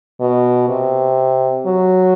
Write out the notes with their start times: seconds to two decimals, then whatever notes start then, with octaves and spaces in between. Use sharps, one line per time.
0.21 B2
0.69 C3
1.66 F#3